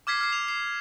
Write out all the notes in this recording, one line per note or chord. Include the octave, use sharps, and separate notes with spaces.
D6 F6 G#6 B6 C7
F6 C7
F7
C7